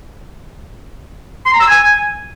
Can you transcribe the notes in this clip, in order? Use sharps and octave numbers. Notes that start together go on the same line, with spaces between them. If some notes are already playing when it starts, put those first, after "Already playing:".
C6
A#5
E6
G#5